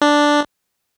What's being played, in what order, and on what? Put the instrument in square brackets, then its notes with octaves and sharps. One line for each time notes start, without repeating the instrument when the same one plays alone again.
[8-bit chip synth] D4